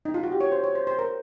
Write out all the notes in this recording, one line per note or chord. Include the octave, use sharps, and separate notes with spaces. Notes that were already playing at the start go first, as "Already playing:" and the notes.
D#4
F4
F#4
G4
C#5
C5
C#5
C5
C5
A#4